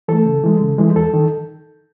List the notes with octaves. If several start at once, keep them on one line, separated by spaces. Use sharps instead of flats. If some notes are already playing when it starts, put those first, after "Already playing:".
E3 A3 A4
C#3
E3 G#3
C#3
E3 G#3
E2 A4
D#3